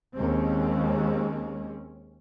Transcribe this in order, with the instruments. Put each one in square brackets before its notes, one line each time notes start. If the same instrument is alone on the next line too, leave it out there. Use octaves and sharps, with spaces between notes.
[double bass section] D#2 G#3 C4 C#4